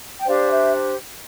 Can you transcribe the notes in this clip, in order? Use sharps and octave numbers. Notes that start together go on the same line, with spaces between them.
G5
D4 G4 C5 D5 F5
E5